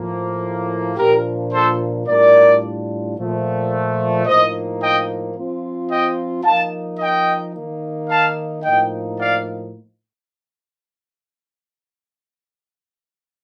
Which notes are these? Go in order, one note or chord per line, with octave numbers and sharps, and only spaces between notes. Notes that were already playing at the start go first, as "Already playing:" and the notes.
Already playing: A2 F3 A#3
A#2 F3 A#3 D4 G4 A#4
A4 C5
A2 G3 D4 F4 A#4 D5
A#2 F3 A3
A2 F3 A#3 D#4 C5 D#5
D#5 G5
F3 C4 F4
D#5 G5
F3 A#3 D#4 F5 A5
D#5 G5
D#3 A#3 D#4
F5 A5
A2 F3 A#3 D#4 D#5 G5
D5 F5